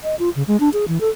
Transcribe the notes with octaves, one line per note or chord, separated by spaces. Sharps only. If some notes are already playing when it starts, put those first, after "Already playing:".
D#5
F4
C#3
G#3
D4
G#4
E3
A4